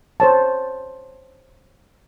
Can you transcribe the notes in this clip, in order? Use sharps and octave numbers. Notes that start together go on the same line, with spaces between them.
C5 C#5 A5